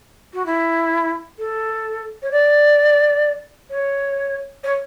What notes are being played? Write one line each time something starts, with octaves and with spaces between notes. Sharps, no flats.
F#4
E4
A4
C#5
D5
C#5
C#5